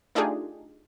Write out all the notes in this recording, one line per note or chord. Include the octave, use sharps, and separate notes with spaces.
A3 D4 D#4 F4 G4 G#4